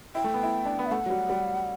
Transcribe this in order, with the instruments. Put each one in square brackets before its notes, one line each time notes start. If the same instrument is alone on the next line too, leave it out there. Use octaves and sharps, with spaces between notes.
[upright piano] E4 [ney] G5
[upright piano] A3
B3
E4
D4
B3
[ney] E5
[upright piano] A3 [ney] F#5
[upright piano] F#3
G3
G3